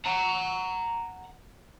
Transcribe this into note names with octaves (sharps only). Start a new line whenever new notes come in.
F#5 A#5